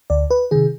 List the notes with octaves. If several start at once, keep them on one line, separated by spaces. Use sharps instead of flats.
D2 D5
B4
C3 D#3 G#4